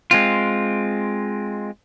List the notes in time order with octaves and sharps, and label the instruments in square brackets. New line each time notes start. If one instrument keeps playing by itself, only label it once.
[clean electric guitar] G#3 C4 F4